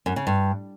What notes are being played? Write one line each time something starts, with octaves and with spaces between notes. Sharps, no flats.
F#2
C#3
G2